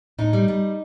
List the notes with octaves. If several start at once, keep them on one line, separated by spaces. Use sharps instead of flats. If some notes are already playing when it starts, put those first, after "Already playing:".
A2 D#4
G3
G3